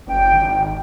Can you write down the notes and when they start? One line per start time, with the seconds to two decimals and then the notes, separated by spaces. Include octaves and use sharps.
0.07 F#1 G5
0.31 G#1